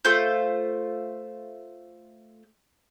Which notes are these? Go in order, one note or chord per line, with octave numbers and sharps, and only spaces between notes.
A3 F4 C5 G6